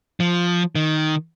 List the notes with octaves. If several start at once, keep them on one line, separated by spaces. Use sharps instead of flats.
F3
D#3